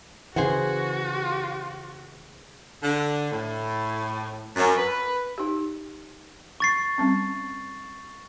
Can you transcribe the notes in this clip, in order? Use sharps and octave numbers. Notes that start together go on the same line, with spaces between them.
C#3 E3 F#4 G#4 C5 F#5
D3
A2
F#2
B4
D#4 G4
C#6 A6 C7
G3 C4 C#4